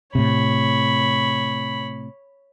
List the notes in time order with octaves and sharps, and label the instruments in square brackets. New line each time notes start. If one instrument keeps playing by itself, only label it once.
[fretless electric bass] A2 C3 [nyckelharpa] C#5 B5